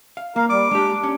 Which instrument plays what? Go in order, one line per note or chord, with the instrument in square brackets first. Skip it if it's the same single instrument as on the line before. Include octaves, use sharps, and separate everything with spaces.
[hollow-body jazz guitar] F5
[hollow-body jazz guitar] A#3 [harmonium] A#4 F5
[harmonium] G3 [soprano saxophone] D6
[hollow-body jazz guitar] G#3 G4 [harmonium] D4
[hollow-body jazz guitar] C#4